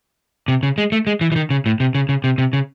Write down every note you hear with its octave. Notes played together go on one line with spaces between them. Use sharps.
C3
C#3
G#3
A3
G#3
E3
E3
D#3
C#3
A2
C3
C#3
C#3
C3
C3
C#3